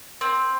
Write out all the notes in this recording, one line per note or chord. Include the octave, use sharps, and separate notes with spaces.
C4